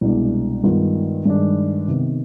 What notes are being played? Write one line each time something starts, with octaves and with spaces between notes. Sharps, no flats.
C2 B2 G#3 D4
G2 D#3 G#3 B3 F4
G2 D#3 G#3 D4
C3 D#3 B3